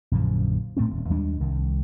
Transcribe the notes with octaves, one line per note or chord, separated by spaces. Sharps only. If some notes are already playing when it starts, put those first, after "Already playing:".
A#1 F#2 D3 F3
A2 A3 C4 C#4
D#1
D#2 G3 G#3 D4
C2 D#3